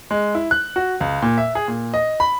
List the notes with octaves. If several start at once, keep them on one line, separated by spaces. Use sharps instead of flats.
G#3
E4
F#6
F#4
C#2
A#2
E5
G#4
A#2
D#5
B5